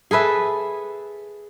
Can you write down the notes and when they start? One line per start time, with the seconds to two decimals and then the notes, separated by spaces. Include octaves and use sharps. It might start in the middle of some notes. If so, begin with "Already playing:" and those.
0.11 G#4 A4 B4 E5